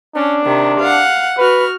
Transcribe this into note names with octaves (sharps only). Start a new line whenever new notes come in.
C#4 D4
C3 D#3
F5 F#5
F#4 B4 F6